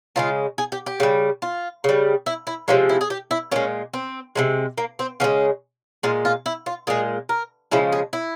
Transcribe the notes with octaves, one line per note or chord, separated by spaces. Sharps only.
C#3 F3 G#3 F4
G#4
G4
G4
C#3 G3
F4
C#3 G3
E4
E4
C3 F3 G#3 C#4
E4
G#4
G4
E4
A#2 G#3 C#4
C4
C3 F3 G#3
A#3
C4
C#3 F3 G#3 C#4
A#2 G#3 F4
F4
E4
F4
A#2 G#3 G#4
A#4
C#3 F3 G#3 E4
G#4
E4